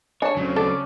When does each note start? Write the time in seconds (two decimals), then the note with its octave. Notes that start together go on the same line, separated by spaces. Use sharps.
0.22 D4 C#5 G#5 A5
0.37 C#3 F#3 C4
0.56 C#3 D4 A4